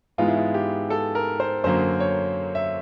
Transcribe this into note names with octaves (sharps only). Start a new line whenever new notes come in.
G#2 E3 G#3 B3 F4
E4
F4
G4
A4
A#4
C5
F#2 D3 F#3 A#3 C5
C#5
E5